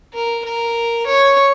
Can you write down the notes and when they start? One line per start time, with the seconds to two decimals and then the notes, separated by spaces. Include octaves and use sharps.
0.13 A#4
0.45 A#4
1.07 C#5